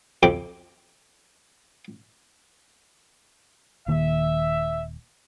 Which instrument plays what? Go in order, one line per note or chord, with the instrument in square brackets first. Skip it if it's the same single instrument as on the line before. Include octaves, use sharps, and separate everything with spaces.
[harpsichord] F2 G5 D6
[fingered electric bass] D#1 D#3 A#3 [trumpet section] E5